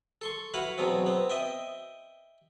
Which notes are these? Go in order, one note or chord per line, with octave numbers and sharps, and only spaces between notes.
A4 C6 C#6
E4 F#4 B4 F5 F#5 B5
E2 B2 F#3 B3 C4
B3 C4
D#5 E5 G5